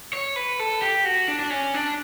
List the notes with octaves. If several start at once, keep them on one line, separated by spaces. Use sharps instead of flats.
C#5
B4
A4
G4
F#4
D4
D4
C#4
D4